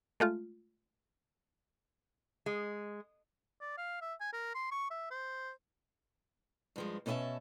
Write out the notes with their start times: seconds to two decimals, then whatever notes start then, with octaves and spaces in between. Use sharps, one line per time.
0.20 G#3 A3 F4
2.46 G#3
3.61 D5
3.77 F5
4.01 E5
4.20 G#5
4.33 A#4
4.54 C6
4.71 C#6
4.91 E5
5.11 C5
6.76 G2 F3 G#3
7.06 B2 C#4 B4 D#5 E5 A5